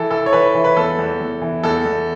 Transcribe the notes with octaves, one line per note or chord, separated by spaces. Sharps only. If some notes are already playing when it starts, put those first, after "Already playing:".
Already playing: E3 A4
E3 A4
C#5
E3 B4
E3
B4
E2 A4
E2
E2
E3
E2 A4
E2